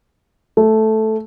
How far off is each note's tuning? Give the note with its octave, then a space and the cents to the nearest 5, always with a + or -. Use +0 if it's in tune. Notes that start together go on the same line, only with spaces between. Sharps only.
A3 -5